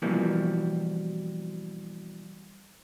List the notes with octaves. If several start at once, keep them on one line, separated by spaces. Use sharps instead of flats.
B2 E3 F3 G3 A#3 C4